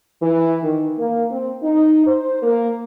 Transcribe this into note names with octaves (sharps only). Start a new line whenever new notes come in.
E3
D#3
A#3
C4
D#4
C5
A#3